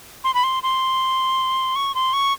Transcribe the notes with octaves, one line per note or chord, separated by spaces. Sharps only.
C6
B5
C6
C6
C#6
C6
C#6